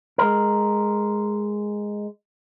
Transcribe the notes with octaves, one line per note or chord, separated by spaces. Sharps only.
G#3 A#4